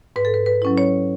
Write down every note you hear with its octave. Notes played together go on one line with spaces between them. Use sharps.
G#2 B4
A4
B4
B4
F#3 C#4 E4
C#5